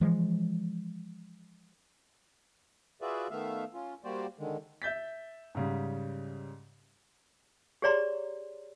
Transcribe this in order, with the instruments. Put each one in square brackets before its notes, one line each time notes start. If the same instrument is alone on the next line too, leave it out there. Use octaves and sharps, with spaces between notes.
[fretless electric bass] E3 F3 G#3
[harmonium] F4 F#4 G#4 B4 D5 E5
D#3 A3 B3 E5 F5
C#4 F4
G3 A#3 F#4 G4 C5 D5
D3 D#3 G#3
[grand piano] E5 G6 A6 B6
G#2 C#3 G3
[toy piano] G4 G#4 C#5 D5 A#5 C6